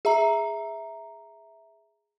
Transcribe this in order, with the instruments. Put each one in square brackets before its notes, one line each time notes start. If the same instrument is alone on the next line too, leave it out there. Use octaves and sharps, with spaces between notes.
[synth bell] G#4 E5 A#5